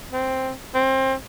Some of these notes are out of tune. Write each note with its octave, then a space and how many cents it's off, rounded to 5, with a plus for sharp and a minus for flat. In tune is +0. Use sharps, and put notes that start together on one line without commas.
C4 +5
C4 +25